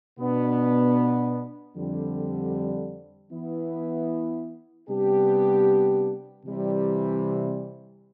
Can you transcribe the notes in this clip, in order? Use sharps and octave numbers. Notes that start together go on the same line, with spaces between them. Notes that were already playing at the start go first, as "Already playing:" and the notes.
B2 B3 D4
F2 D3 G3
E3 B3 E4
C3 G3 B3 D4 G4
C3 E3 G3